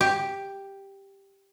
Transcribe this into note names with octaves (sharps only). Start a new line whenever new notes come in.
G4